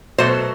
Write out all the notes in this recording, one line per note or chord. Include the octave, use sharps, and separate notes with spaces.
B2 F#3 A3 C5